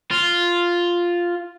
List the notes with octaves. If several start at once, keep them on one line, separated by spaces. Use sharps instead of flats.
F4